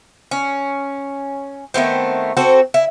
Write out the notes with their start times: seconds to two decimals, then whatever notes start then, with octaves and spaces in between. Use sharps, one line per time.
0.31 C#4
1.74 D#3 A3 B3 C4
2.37 C4 F#4 A4 C5
2.74 E4